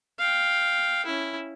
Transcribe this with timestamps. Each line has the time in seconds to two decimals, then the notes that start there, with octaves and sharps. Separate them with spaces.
0.18 F5 G5
1.05 C#4 E4